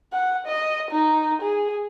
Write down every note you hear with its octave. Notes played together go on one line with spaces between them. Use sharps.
F#5
D#5
D#4
G#4